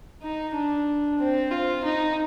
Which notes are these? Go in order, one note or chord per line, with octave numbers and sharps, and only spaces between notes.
D#4
D4
C4
F4
D#4